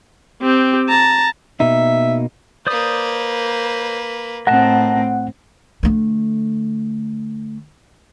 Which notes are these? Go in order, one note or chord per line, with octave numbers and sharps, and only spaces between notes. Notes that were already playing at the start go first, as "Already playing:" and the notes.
C4 G4
A5 A#5
B2 A#3 D#4 E5
A#3 B4 C5 D5 D#6
A2 C4 A#4 D#5 F#5 A5
D3 A3